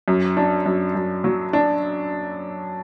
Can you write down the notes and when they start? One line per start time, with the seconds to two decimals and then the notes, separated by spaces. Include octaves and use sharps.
0.08 F#2
0.37 D4
0.66 F#2
0.95 F#2
1.24 F#3
1.53 D4